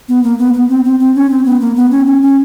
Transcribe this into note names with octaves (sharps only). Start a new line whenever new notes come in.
B3
A#3
B3
B3
C4
C4
C4
C#4
C4
B3
A#3
B3
C#4
C#4
C#4